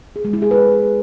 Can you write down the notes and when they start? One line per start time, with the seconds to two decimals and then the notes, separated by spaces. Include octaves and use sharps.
0.16 G#4
0.25 G#3
0.33 E4
0.42 G#4
0.51 B4